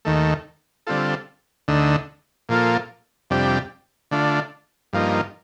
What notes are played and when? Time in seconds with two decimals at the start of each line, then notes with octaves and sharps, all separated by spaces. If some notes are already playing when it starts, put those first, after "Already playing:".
0.05 D#2 D#3 A3
0.87 D3 G3 C4 F4 A4
1.68 D2 D3 A3 D#4
2.49 A#2 F3 A#3 F4 A4
3.30 F2 C3 G3 D4 G4
4.11 D3 A3 D4 F4
4.93 G2 F3 A#3 D#4